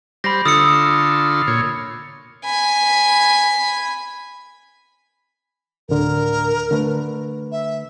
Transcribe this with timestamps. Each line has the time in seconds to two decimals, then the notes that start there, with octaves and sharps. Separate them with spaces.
0.24 G3 C5 B5 A#6
0.45 D3 F4 A4 D#6 E6 C#7
1.48 A#2 C#5
2.45 G#5 B5
5.89 D2 A2 D3 A#4
6.71 D3 A3 B4
7.52 E5